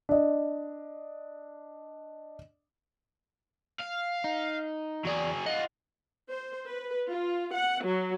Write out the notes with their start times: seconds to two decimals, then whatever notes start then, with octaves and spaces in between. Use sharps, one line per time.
0.09 D4 D#5
3.79 F5
4.24 D#4
5.05 E2 F#3 G#4 D5
5.46 F4 D#5 F#5
6.29 C5
6.67 B4
7.08 F4
7.53 F#5
7.83 F#3